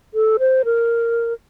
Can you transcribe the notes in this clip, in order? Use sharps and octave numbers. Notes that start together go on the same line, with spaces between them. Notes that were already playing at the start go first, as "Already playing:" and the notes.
A4
C5
A#4